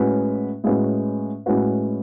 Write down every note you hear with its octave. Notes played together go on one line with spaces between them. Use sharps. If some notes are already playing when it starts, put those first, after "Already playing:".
Already playing: A2 G#3 C#4 F#4 B4
A2 G#3 C#4 F#4 B4
A2 G#3 C#4 F#4 B4